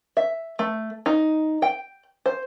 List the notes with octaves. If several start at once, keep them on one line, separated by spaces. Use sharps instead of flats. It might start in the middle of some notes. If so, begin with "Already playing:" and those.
E5
A3
D#4
G5
C5